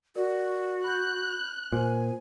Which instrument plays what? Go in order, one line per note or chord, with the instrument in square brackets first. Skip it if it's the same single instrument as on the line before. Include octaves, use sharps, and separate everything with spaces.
[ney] F#4 [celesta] A#4 D5
[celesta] B5 G6 [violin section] F#6
[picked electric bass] A#2 [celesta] C5 [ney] G#5